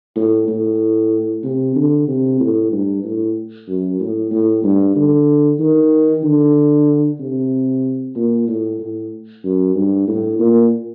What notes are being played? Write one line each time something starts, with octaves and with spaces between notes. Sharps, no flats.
A2
A2
C3
D3
C3
A2
G2
A2
F#2
A2
A2
G2
D3
D#3
D3
C3
A#2
A2
A2
F#2
G2
A2
A#2